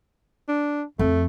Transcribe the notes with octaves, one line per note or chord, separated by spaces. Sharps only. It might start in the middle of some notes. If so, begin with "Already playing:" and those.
D4
F2 A3